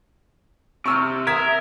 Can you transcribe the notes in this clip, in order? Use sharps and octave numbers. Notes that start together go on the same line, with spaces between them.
C3 C#6 E6 F6
A#4 E5 D#6 G#6 B6